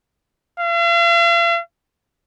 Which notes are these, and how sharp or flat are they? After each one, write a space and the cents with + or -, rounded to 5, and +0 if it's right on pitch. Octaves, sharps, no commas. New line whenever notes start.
F5 -45